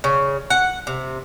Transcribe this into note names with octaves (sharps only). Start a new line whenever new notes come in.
C#3
F#5
C3